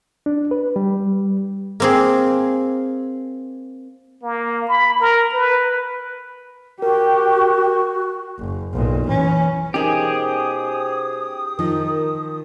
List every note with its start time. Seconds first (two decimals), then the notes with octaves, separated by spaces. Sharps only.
0.26 D4
0.51 B4
0.76 G3
1.80 A#3 C4 G#4
4.23 A#3
4.68 B5
5.01 A#4
5.34 B4
6.82 F#4 G4 A#4
8.39 F#1
8.73 B1 A#2
9.07 E3 C#4
9.74 B2 C#4 D#4 G4 G#4 A#4 C5 D#6
11.59 D#3 F3 D#4 A#4